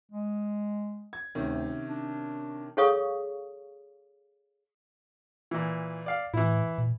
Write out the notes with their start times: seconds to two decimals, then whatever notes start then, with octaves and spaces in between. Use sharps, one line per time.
0.12 G#3
1.13 G#6
1.35 D2 C3 D#3 C#4
1.88 D4
2.77 G#4 A4 C#5 F5 C#6 D#6
5.51 A#2 E3
6.06 D5 F5
6.34 A2 E3 E4
6.78 A#2